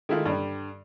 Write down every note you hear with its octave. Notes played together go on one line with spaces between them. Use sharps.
D#3 G#3 A3 E4 F4
G2 D3 G3